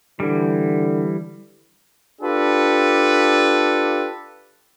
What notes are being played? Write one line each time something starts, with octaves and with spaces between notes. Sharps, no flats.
D3 E3 G3
D4 F4 G4 A4 B4